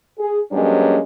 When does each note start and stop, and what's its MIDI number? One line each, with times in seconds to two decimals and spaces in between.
0.19 0.39 68
0.52 1.00 43
0.52 1.00 54
0.52 1.00 56
0.52 1.00 58
0.52 1.00 61